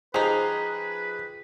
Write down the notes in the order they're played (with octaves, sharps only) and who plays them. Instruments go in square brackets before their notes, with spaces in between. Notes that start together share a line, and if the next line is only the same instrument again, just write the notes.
[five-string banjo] F3 D#4 [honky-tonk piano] G4 G#4 [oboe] B4